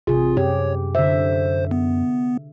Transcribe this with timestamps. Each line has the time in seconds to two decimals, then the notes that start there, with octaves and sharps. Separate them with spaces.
0.07 A1 C3 F4 G#4
0.37 F#2 G4 C#5
0.95 D3 C5 E5
1.71 B3